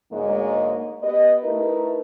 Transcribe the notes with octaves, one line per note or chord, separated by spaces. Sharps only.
D2 G#2 G#3 A#3 C#5
B3 G4 D#5
A3 D#4 E4 A#4 B4